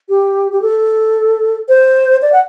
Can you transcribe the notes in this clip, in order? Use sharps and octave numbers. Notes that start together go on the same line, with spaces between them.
G4
G4
A4
C5
D5
F#5